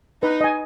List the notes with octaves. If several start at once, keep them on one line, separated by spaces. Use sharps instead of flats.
D#4 B4
D#5 G#5